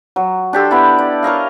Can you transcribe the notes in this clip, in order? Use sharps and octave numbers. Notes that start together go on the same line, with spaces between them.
F#3
D4 G4 A4 C6
B3 E4 D5
D5
A#4 C#5 D#5 F5